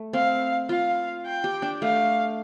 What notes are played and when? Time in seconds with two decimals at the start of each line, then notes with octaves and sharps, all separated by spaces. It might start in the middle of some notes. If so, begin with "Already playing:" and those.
Already playing: A3
0.13 C4 F5
0.69 F4 F5
1.26 G5
1.44 G4
1.62 D4
1.82 A3 F5